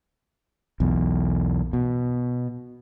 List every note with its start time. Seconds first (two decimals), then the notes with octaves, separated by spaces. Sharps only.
0.80 B1 E2
1.73 B2